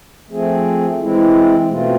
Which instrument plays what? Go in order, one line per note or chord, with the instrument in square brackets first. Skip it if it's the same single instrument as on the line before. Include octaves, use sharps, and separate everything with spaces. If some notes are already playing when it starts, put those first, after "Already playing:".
[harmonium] F3 A3 C4 G#4
E3 G#3 C4 E4
B2 A3 C4 F4